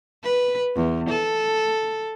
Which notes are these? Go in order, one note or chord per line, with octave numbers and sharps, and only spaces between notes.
B4
E2
A4